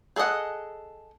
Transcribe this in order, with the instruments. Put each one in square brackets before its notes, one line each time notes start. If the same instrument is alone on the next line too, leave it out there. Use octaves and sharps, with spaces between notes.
[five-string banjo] G#4 A4 D5 D#5 F#5